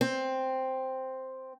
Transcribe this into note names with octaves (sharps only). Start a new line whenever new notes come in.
C4